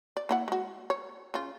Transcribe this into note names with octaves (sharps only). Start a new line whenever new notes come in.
D5
A#3 E4 F#5
G#3 F#4
C#5
C#3 F4